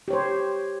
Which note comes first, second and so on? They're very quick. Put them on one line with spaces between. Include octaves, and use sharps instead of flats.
G4 C#5 C5